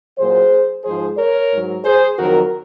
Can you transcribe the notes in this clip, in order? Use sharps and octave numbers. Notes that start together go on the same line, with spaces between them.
A#2 F#3 G#4 C5
G#2 F3 G#3 G#4 C5
A#4 C#5
G#2 F#3
G#4 C5
F2 D#3 F#3 F#4 A#4